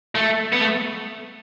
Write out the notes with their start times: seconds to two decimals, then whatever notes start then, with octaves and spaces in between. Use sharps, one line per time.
0.15 A3
0.52 B3
0.60 A3